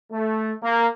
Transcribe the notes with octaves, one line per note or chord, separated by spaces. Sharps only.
A3
A#3